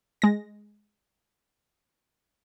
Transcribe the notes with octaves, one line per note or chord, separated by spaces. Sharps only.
G#3 A#6